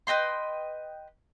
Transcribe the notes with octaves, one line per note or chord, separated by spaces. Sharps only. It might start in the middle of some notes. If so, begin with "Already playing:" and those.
B4 D#5 G5 C6